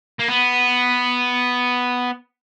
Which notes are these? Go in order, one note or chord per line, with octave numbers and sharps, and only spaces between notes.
A#3
B3